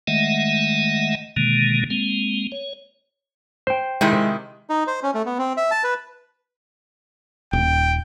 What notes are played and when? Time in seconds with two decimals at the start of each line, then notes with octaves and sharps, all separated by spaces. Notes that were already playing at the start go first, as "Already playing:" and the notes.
0.08 D#3 G#3 A3 D#5 E5 F#5
1.36 B2 D3 D#3 G#3 A#3
1.90 G#3 A#3 C4
2.52 C#5
3.67 C5 G5
4.01 C3 D#3 G#3 E4
4.70 D#4
4.87 C5
5.03 C#4
5.14 A3
5.26 B3
5.38 C4
5.57 E5
5.71 A5
5.84 B4
7.53 D#1 G5